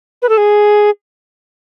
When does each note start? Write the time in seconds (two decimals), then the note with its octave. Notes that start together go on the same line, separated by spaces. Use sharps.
0.22 B4
0.29 A4
0.37 G#4